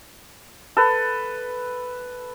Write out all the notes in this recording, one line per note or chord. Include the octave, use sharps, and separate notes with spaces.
A4 B4